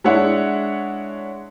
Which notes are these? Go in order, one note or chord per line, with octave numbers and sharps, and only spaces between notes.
G#3 D4 E4 C#5 E5 F#5